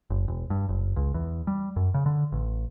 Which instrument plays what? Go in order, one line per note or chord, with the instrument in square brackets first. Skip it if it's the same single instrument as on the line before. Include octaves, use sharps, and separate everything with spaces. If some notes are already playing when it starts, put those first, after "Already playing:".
[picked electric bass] F#1
E1
G2
F#1
C#2
E2
G3
F#2
C#3
D3
A1